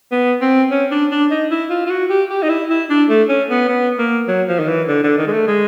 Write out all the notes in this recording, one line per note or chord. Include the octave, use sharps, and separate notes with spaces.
B3
C4
C#4
D4
D4
D#4
E4
F4
F4
F#4
G4
G4
D#4
E4
E4
D4
A3
C#4
B3
B3
A#3
F#3
F3
D#3
E3
D3
D3
D#3
G#3
A3
G#3